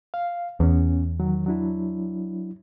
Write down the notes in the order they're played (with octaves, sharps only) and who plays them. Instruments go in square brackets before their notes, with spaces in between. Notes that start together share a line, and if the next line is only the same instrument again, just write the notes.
[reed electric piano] F5
[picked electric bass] E2 [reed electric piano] B3 C#4
[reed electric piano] D#3 F#3
F#3 D4 E4